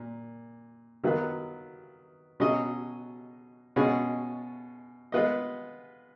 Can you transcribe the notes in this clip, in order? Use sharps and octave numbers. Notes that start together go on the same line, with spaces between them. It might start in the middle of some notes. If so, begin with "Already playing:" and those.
Already playing: A#2
D#3 F#3 B3 F4 B4
B2 F#3 C#4 G#4 D#5
B2 G#3 C#4 F4 G#4
G#3 B3 F4 B4 D#5